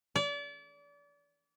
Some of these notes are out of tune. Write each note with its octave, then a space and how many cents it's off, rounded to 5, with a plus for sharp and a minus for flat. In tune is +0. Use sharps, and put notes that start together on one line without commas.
D5 -35